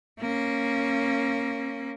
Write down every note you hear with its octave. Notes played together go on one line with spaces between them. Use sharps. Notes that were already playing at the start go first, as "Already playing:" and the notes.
A#3 C#4